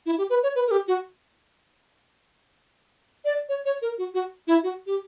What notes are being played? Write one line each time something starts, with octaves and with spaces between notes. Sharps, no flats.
E4
G4
B4
C#5
B4
A#4
G4
F#4
D5
C#5
C#5
A#4
F#4
F#4
E4
F#4
G4